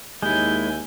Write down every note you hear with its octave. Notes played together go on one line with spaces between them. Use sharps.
D#2 G#3 E4 G#5 G6